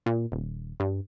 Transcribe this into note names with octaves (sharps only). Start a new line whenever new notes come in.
A#2
D#1
G2